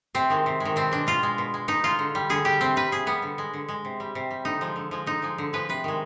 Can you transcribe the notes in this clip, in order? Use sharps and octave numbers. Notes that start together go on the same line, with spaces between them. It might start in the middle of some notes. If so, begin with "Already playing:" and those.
C3 C4
D#3 G#3
C3
G#3
D#3
B2 C4
G#3 D4
B2 F4
G#3
B2
G#3
B2 D#4
G#3 F4
D3
G3
D3 G#4
G3 G4
C3 C4
G3 B4
C3 G#4
G3 B3
D3
G#3
D3
G#3
C3
G3
C3
G3
D3 D#4
F3 G#3
D3
F3 G#3
D3 D#4
F3 G#3
D3
F3 G#3 B4
C3 B4
D#3 G#3